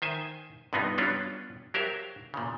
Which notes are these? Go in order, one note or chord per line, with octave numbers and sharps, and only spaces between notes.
D#3 C5 E5 G#5
G2 C3 B3 D#4 F4
F#3 G3 B3 C#4 D4 F4
F#3 G4 A#4 C5 E5 F5
A#2 C#3